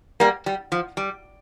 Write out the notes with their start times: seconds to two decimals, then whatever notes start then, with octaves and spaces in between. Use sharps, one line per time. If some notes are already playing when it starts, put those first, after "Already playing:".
0.20 G3 A#3
0.46 G3
0.72 F3
0.97 G3